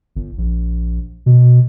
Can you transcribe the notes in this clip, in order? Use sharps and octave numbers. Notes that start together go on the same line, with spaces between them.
G1
A#1
B2